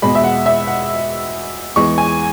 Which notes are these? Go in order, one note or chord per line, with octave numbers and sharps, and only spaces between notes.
E2 B2 G#3 B5
E5
F#5
E5
F#5
E2 E3 G#3 C#6
G#5